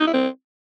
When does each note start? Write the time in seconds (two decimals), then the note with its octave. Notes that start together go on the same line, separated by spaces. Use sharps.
0.01 D#4
0.07 E4
0.14 C4